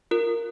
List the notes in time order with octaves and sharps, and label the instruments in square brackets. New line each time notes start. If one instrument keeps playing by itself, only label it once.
[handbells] F4 A#4